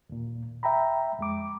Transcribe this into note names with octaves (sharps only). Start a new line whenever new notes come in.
D#2 A#2
E5 G5 A#5 B5
F2 G#3 D6